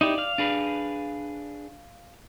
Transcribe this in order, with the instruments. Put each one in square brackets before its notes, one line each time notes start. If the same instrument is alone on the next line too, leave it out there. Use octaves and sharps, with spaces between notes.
[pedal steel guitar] D#4 E4 G4 [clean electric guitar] D5
[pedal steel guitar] F5 F6
[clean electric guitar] D4 G#4 B4